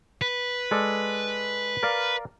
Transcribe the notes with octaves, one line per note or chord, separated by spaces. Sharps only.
B4
G#3 A4 D5
A#4 D5 F5